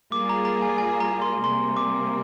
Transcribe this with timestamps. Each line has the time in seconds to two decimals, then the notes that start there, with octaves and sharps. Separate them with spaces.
0.12 G3 A#3 F4 G#4 D6
0.29 A#5
0.45 A#5
0.62 G#5
0.78 G#5
1.00 A#5
1.22 C6
1.44 C3 G3 A#3 C6
1.77 D6